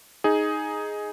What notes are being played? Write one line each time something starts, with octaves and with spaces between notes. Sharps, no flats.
D#4 G#4